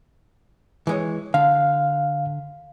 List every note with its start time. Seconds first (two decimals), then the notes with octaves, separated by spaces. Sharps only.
0.87 E3 G#3 C#5
1.34 D3 F5